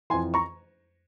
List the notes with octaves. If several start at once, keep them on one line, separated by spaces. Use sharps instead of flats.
F2 E3 G#5 C6
A#5 C#6